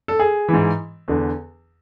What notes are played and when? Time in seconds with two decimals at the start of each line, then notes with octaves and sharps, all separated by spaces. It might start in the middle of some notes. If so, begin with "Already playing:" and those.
0.08 A4
0.19 G#4
0.48 G#2 E3
1.08 E2 D3